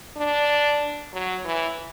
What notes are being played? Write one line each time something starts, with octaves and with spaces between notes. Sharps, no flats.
D4
F#3
E3